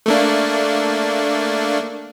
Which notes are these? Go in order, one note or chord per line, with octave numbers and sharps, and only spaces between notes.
A3 A#3 D4